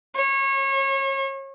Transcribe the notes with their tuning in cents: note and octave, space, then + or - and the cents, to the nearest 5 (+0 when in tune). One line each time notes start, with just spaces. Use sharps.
C#5 -30